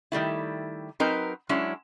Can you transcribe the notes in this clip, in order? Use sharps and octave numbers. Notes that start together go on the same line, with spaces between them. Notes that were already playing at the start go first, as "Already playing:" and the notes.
D#3 G3 A3 E4
F#3 C4 D#4 A#4 B4 A#5
F#3 G#3 C#4 D4 E4